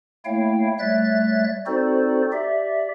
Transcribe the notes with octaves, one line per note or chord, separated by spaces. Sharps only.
A3 A#3 E4 C#5 F5 G5
G3 A3 C#5 E5 F#6 A6
C4 D#4 F#4 A4 C5 D5
G4 D5 E5